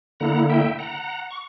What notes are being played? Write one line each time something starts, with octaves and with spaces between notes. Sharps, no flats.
D3 A#3 E4 F#5 A#5
E5 G5
F#5 A#5
C#6